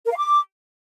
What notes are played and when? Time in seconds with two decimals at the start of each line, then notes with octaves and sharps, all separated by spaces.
0.05 A#4
0.11 F5
0.17 D6